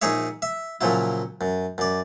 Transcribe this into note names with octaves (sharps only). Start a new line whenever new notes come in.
A#1 D#4 G#4 C#5 E5
E5
A#2 C#3 F3 F#3 E4
F#2
F#2 D5